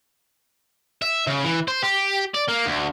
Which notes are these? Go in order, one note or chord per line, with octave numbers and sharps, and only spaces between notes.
E5
C#3
E3
C5
G4
D5
A#3
D2